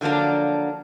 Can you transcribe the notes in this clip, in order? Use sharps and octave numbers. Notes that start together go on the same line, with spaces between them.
D3 F3 F#3 A#3 D4